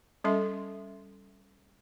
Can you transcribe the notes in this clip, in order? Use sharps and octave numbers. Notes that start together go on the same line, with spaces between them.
G3 C#4 A4 E5 C6